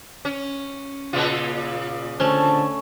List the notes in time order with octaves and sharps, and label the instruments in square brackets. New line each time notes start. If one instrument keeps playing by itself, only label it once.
[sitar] C#4
A#2 C#3 F4
[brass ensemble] D3 A5 [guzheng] A3 C#4 [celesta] C5